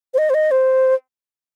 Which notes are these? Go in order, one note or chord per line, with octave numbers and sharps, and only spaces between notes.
C5
D#5
C5
D#5
C5